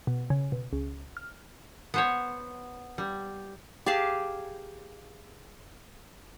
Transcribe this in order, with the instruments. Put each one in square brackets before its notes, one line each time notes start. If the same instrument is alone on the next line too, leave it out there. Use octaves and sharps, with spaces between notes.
[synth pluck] B2
C#3
B2
C#2
F6
[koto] B3 C5 C#5
G3
[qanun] G4 G#4 F5 A5